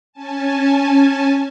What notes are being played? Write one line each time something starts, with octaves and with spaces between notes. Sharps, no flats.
C#4 G#5 A5